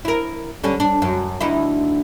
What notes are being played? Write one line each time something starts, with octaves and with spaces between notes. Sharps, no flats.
E4 A#4
D3 G3 C#4
D4
F#2
D2 D#4 E4